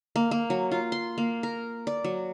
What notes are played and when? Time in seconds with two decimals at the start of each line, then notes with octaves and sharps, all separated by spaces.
0.16 A#3
0.31 A#3
0.50 F#3
0.72 F4
0.92 C6
1.18 A#3
1.43 A#4
1.87 D5
2.04 F#3